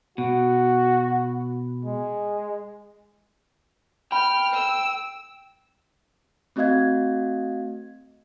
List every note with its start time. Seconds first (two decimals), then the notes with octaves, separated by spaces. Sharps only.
0.18 B2 F#4
1.85 G#3
4.12 G5 B5 F6
4.54 E6
6.56 A3 C4 F#4 D#5 F5 G#6